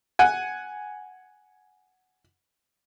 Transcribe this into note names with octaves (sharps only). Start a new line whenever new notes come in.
F#5 G#5